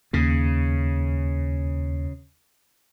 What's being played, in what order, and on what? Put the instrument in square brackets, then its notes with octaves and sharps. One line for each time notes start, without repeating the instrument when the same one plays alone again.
[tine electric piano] D#2 [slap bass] C#3